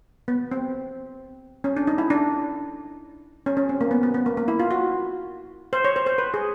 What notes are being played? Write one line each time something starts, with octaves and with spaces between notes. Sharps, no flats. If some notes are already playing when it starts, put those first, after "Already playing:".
B3
C4
C#4
D4
D#4
E4
D4
C#4
C#4
C4
A#3
B3
B3
B3
A#3
A#3
E4
F4
F#4
C5
C#5
C5
C5
B4
G#4